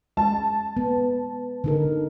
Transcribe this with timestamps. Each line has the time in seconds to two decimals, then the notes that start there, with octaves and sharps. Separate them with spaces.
0.17 G#3 A5
0.77 B3
1.64 D3 D#4 A#4